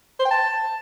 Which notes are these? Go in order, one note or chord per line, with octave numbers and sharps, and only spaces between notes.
C5
G5
A5